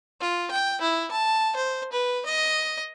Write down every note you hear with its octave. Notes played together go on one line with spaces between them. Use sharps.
F4
G5
E4
A5
C5
B4
D#5